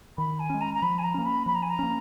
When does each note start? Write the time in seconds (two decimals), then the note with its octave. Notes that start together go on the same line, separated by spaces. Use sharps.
0.18 D#3 B5
0.39 G#5
0.50 G#3 C#4
0.61 A#5
0.74 A#5
0.82 F3 B5
0.98 G#5
1.04 A#5
1.14 A#3 C#4
1.25 B5
1.46 F3 B5
1.55 A#5
1.62 G#5
1.70 A#5
1.79 A#3 C#4